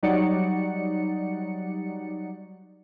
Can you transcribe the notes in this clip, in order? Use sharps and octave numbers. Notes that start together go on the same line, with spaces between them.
F#3 G3 D#4 D5 F#5 C#7